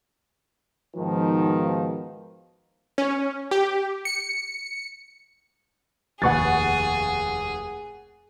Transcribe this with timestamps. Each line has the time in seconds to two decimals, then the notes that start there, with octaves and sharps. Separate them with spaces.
0.97 G#2 B2 D#3 F3
2.98 C#4
3.51 G4
4.05 C#7
6.22 F1 D#2 G#4 B4 F#5 C#6 A6